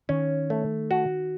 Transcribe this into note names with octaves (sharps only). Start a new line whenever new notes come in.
D#3 C#4
A3
F#4